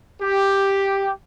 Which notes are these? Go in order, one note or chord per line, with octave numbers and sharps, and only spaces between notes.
G4